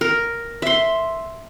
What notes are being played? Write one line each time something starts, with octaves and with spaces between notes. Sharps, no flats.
A#4
E5 C6